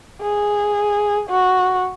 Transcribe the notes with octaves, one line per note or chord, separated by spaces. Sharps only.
G#4
F#4